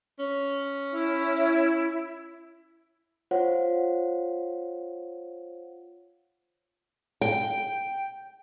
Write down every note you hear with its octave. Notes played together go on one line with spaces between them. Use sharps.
C#4
E4
F4 C5 C#5 F5 F#5
G5